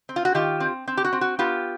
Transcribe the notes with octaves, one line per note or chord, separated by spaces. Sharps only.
C4
F4
F#4
D#3 F4 G4
C4
C4
G4
F#4
C4
F#4
B3 F4 G4